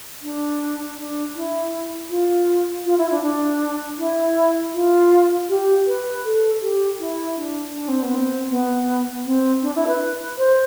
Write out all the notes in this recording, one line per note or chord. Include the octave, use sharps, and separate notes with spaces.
D4
D4
E4
F4
F4
E4
D4
D4
E4
F4
G4
B4
A4
G4
E4
D4
D4
C4
B3
C4
B3
C4
D4
E4
B4
C5